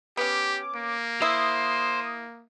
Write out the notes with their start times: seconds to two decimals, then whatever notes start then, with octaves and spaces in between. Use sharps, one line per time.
0.17 B3 C#4 G4 D6
0.75 A#3
1.22 E4 C5 D#6